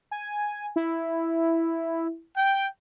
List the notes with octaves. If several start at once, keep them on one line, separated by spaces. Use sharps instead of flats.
G#5
E4
G5